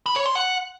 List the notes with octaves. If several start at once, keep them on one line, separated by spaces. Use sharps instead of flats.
B5
C#5
C6
F#5